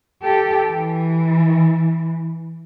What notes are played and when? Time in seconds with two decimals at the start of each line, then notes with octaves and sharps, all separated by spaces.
0.23 G4 A4
0.69 E3